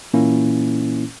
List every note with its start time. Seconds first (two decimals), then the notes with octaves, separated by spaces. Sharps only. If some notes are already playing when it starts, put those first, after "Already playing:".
0.13 A#2 E3 A#3 C#4 E4